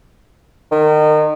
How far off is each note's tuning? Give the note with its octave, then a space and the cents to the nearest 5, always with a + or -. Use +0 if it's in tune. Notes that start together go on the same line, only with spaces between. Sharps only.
D#3 -30